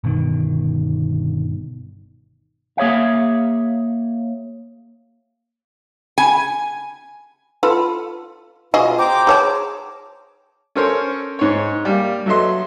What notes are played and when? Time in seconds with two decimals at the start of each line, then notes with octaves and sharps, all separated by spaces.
0.04 G1 B2 D#3
2.77 A#3 G#4 C#5 E5 F5
6.18 G#5
7.63 F4 A4 B4
8.74 B2 F4 F#4 G#4 D#5
8.99 C5 G5 A#5 D6
9.27 G#4 C#5 A5
10.75 C#4 A4 A#4 C5 C#5
11.39 G#2 C#5
11.85 G3 A#3
12.26 F#3 A4 D#5 E5 C6